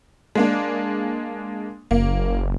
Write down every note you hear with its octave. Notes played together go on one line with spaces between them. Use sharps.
G#3 A#3 D4
F#1 A#3